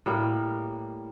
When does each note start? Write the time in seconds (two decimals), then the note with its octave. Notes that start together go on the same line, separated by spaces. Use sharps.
0.06 A2 G3 A#3